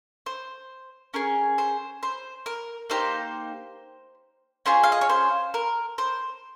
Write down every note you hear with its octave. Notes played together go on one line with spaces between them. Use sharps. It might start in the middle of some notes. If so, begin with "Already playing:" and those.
C5
C#4 G#4 A#4
C5
C5
A#4
A#3 D#4 G4 C5
C#4 F4 G#4 C5
F5
D#5
C#5
C5
A#4
C5